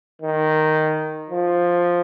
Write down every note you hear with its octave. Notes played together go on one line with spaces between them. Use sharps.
D#3
F3